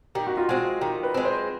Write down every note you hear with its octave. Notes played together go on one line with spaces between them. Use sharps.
D#3 G4
F#4
F4
G#3 C4 F#4
D#3 G4
B4
G#3 C4
C5